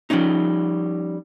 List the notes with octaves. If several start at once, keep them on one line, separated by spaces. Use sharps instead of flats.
F3 G3 A3 C#4 D#4